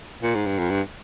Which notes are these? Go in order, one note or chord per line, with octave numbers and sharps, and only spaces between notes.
A#2
G#2
G2
F2
G2